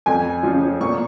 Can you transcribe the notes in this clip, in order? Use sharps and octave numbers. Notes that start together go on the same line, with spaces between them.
F2 G#5
C#3 F3
A#2 C#6